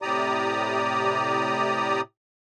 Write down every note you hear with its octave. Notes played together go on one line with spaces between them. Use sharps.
A2 C3 G4 D5 A#5 D#6